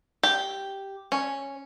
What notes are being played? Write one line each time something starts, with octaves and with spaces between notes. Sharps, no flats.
G4
C#4